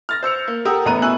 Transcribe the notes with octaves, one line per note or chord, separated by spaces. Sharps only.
F6 A6 A#6
C5 E6 C#7 F7
A#3
G4 A4 A#4 F#5 D#6 E6
A1 A3 B3 A#5 F#6 D#7
B2 E4 G#5 E6 F#6 F#7